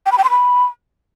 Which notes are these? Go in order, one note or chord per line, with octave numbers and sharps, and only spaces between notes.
G5
B5
G5
C6
B5